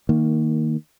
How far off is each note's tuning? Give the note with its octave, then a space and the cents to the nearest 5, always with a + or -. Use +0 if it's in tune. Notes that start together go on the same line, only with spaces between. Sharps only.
D#3 +0 A#3 -15